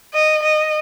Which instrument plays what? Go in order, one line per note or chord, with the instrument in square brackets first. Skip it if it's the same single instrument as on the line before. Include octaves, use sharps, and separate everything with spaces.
[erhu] D#5
D#5